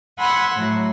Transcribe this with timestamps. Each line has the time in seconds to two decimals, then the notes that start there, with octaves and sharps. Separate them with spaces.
0.17 F#5 G#5 B5 C6 E6 F#6
0.55 A2 F#3